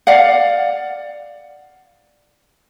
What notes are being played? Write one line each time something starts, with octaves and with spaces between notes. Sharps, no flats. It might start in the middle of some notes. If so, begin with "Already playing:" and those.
D5 F5 F#5